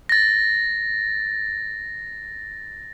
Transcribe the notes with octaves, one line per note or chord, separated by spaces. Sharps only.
A6 A#6